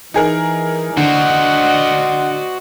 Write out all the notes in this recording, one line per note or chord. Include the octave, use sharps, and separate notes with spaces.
E3 D#4 G#4 A#4
D3 F#4 C5 D5 D#5 F#5